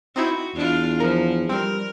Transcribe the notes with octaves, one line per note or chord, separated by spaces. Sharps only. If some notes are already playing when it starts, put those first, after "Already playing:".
C4 D#4 E4 F#4
E2 D4 F4
F3 A#4
G3 C4 A#4